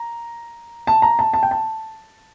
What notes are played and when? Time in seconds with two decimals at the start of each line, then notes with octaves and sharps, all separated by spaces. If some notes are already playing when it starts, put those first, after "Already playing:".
Already playing: A#5
0.87 A5
1.02 A#5
1.19 A5
1.34 A5
1.43 G5
1.51 A5